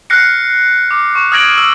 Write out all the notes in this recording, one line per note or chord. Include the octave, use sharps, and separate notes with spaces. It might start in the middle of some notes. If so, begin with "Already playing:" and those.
F6 F#6 A#6 C7 C#7
D6
C#6
D#6 F6 G#6 A#6 D7 F#7
E6 F#7